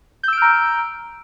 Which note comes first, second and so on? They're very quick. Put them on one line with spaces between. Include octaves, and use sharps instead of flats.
G6 E6 D7 F6 A#5